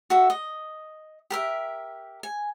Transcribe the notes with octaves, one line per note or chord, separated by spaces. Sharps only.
F#4 A4 E5
D#5
G4 A#4 E5
G#5